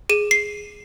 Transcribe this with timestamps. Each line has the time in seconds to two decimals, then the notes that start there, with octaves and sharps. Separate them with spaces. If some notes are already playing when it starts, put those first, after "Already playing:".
0.09 G#4 D#7
0.31 C7